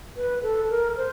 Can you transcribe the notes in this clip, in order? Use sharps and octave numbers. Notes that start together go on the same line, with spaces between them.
B4
A4
A#4
C5